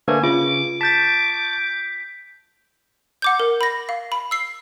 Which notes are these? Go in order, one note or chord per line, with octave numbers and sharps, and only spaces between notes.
D3 A3 A#3 B4 G#5
C#3 F4 D6
A5 D6 G6 A6 B6
F#5 D6 G6
A#4
B5 A#6
F5
B5
E6 C7